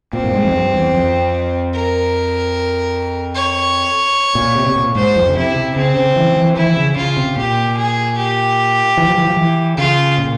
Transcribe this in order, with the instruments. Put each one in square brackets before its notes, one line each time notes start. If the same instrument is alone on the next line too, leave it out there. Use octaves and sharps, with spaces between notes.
[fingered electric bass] A#2 [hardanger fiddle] C4
[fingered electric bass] G2
G#2
F2
G2
E2
F2
[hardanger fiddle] A#4
C#5
[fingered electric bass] A#2
C3
C3
A#2
[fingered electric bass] G#2 [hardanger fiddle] C5
[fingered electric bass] F2
C#3
[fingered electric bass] C3 [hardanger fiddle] E4
[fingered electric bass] C3
[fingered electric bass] C#3 [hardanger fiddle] C4
[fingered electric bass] C#3
E3
E3
[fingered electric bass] E3 [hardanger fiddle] E4
[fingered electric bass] E3
C#3
[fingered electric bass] C#3 [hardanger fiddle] F4
[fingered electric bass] C3
[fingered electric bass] A#2 [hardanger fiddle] G4
[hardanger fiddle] G#4
G4
[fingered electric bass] E3
F3
E3
F3
E3
[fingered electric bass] C#3 [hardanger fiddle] F4
[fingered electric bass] A#2